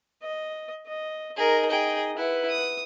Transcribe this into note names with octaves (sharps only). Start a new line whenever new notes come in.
D#5
D#5
D#4 G#4 A#4 D#5
G#4 G5
E4 B4 F#5
D#6